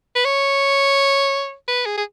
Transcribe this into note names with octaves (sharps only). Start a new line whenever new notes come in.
B4
C#5
B4
G#4
G#4